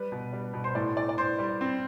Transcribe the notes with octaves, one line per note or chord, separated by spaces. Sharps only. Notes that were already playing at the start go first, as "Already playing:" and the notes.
Already playing: G3 B4
B2
G3
B2
C5
A2 D5
A2 D5
D5
A2 C5
G3
C4